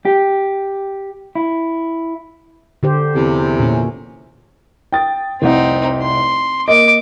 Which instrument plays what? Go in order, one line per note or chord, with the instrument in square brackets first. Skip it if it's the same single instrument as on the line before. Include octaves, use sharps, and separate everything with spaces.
[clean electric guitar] G4
E4
[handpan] D3 G4 C5
[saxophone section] E2 C3
[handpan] A#2 C#4
[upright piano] G5 D#6 A6
[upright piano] F1 C2 F#5 [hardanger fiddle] C4 D#4
[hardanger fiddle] C6
[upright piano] A#3 D#5 [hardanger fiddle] D6